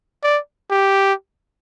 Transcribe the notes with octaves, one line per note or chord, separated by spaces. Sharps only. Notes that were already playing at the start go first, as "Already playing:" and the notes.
D5
G4